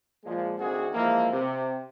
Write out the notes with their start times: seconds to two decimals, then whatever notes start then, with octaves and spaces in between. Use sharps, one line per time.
0.24 A#2 F3 G#3
0.59 D2 D#3 C4 F#4 G#4
0.94 E3 F3 G#3 A#3
1.32 C3